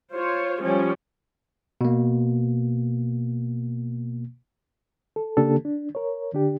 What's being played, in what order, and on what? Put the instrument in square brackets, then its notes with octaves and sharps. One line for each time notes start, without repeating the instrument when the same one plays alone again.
[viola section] F4 C5 C#5
F3 G3 C#4
[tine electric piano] B2 A#3
[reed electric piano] A4
C#3 A#3 D4 G4 A4
D4
A#4 C#5
D3 D4 G4